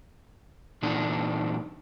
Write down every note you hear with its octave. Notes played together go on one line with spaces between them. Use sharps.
A#2 E3 D4 D#4